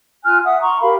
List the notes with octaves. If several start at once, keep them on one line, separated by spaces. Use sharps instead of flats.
F4 G#5 F6 F#6
E5 F#5 D#6
A#5 C6 C#6
G4 A#4 F5 B5